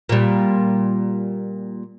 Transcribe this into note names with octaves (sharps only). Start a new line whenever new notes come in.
A#2 G3